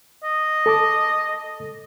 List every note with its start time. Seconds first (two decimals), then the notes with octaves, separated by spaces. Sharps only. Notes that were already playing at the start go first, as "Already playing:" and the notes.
0.23 D#5
0.66 A4 A5 D6